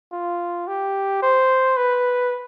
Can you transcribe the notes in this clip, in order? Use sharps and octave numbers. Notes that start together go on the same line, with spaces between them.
F4
G4
C5
B4